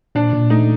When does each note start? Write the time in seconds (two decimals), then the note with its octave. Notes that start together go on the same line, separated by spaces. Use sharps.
0.15 A#2 D4
0.33 A#2
0.50 A3 D#4